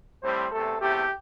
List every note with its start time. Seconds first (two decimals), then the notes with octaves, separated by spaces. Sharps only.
0.22 A2 G3 C4 C5
0.51 E2 C3 A3 A4
0.81 E2 C3 A3 G4